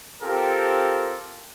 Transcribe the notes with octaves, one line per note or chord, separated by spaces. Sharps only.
C4 F4 G4 A4 A#4